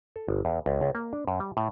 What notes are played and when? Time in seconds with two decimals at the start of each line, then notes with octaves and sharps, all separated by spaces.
0.16 A4
0.28 G1
0.45 E2
0.66 C#2
0.81 C#2
0.95 A#3
1.13 D4
1.27 F#2
1.40 G3
1.57 A2